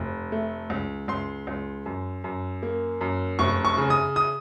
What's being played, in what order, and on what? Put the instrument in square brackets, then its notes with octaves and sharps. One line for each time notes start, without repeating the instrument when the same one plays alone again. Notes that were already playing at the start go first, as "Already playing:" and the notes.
Already playing: [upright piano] F1
A3
C#2
C#2 C6
C#2
F#2
F#2
A#3
F#2
F1 C#6
C#6
C#3
D#6
D#6